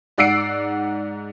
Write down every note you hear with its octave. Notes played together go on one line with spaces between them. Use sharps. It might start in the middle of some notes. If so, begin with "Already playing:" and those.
G#2 D5 F#5 E6 C7 D7